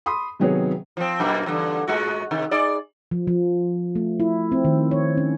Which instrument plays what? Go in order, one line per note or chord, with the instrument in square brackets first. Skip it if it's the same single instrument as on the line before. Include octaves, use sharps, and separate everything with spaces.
[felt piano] B5 C6 D#6
C3 D#3 F#3 B3 G#4 C#5
[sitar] F3 C4
F#2 B2 A#3
E2 G2 D3
A2 G#3 F#4
C3 D#3
D#4 G#4 D5
[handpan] F3
F3
A3
E4
C4
D#3
C#5
C#4